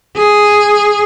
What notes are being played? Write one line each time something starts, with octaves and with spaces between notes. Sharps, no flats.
G#4